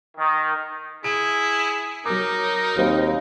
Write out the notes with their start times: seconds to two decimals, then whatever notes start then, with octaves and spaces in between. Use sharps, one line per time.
0.17 D#3
1.04 E4 G#4 D7
2.06 F#3 D#4 A#4 D6
2.77 D#2 F#3 C4 C5